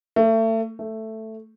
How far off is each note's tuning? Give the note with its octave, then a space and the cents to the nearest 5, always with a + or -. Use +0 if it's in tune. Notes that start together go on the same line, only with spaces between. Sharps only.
A3 +30
A3 +5